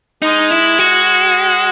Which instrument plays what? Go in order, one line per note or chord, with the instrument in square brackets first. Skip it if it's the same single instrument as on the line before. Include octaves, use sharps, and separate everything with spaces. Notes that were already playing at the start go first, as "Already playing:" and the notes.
[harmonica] G#3 [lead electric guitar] D#4
[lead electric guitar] E4
F#4